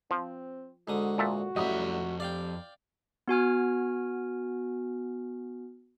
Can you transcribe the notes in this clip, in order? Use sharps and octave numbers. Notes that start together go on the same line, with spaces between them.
F3 C4
G#2 D3 F#4 D#6
A#2 F#4 A4 E5
A1 F2 F#3 G3 D#5 E5
G4 D5 F5 G5
B3 F#4 G#5 F6